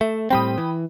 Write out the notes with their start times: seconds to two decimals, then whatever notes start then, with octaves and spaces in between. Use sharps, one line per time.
0.01 A3 E5
0.30 A2 G3 C4 G5 B5 D#6
0.58 E3